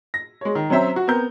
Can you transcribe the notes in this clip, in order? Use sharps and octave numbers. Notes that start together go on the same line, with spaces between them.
A#6
G#3 C#5
D#3
F#3 C4 C#4 C5 E5 A#5
F#4
B3 C4 A#4 G6